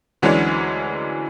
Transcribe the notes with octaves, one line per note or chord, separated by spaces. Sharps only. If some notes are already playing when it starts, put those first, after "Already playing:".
D2 E3 F#3 G#3 C#4 D4